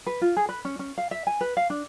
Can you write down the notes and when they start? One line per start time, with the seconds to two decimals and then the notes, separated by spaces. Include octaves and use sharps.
0.07 B4
0.21 F4
0.37 G#4
0.49 B4
0.65 C#4
0.79 C#4
0.98 F5
1.11 E5
1.27 G#5
1.41 B4
1.57 F5
1.70 D4